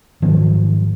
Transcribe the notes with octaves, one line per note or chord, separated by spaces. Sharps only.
G#2 D#3 F3 F#3